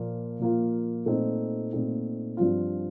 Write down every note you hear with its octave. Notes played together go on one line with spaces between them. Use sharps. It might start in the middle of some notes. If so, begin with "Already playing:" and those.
Already playing: A#2 F3 A#3 F4
A#2 F3 A#3 F4
A#2 A3 C4 D#4
A#2 A3 C4 D#4
G2 F3 C4 F4